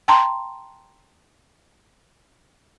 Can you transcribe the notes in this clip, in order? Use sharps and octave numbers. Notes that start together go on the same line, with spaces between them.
G5 A5 A#5 C6